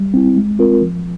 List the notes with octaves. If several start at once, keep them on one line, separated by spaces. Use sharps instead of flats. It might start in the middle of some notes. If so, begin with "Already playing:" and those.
Already playing: G3
C4 E4
G#3
C4 F4 A#4
F3